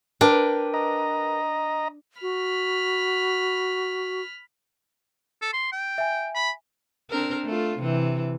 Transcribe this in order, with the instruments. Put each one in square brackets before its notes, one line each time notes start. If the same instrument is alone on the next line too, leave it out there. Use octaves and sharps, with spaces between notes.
[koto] D4 [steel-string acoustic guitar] A#4 B4 G5
[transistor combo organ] D#5 A#5
[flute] F#4 [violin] B5 F6
[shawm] A4
C6
G5
[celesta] E5 G#5
[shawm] B5
[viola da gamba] C4 D4 A#4
A3 F4
C3 E3